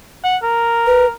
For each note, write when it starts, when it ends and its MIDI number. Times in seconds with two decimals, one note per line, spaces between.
0.24 0.37 78
0.43 1.12 70
0.86 1.06 71